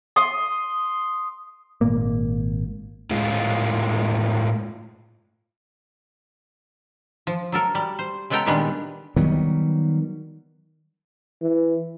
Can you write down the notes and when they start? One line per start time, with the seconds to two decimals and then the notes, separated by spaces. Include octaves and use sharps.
0.16 C6 D#6
1.81 G#1 A#2 A#3
3.11 A2 G#3 F4
7.27 F3
7.52 F#3 A4 A#4
7.75 G3
7.99 C5
8.30 C#3 G#3 B3 A4 G5 A#5
8.46 A#2 D#3 G3 G#3 B3 D4
9.16 D#3 F#3 G3 B3
11.42 E3